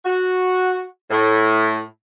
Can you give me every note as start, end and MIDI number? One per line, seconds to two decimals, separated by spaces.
0.05 0.84 66
1.11 1.82 45